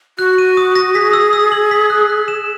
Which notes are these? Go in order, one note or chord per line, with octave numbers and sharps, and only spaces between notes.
F#4 F#6
D#7
D#6
A#6
G#4 B6
E6
E6
F#7
B6
F#6
F#6
E7